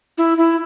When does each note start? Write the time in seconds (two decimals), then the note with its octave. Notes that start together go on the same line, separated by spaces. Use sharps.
0.18 E4
0.38 E4